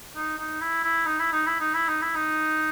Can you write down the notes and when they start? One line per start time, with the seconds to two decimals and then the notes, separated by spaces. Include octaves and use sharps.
0.16 D#4
0.38 D#4
0.61 E4
0.84 E4
1.06 D#4
1.19 E4
1.33 D#4
1.46 E4
1.60 D#4
1.74 E4
1.88 D#4
2.01 E4
2.15 D#4